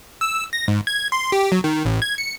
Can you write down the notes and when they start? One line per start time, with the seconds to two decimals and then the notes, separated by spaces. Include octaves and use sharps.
0.21 E6
0.53 A#6
0.68 G#2
0.87 G#6
1.12 C6
1.32 G4
1.52 F#3
1.64 D#3
1.85 A1
2.02 G#6
2.18 C#7